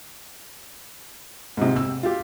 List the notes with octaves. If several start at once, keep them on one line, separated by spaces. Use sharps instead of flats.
G#2 C3
E6
F4 G4